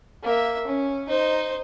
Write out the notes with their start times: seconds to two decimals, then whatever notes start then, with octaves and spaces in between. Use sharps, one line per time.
0.23 A#3 E5
0.67 C#4
1.09 D#4 C5